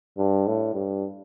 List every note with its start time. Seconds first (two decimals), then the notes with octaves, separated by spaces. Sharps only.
0.17 G2
0.47 A2
0.74 G2